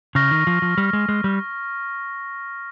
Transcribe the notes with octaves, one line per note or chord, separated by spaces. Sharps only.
C#3 C#6 F6 A#6
D#3
F3
F3
G3
G#3
G#3
G3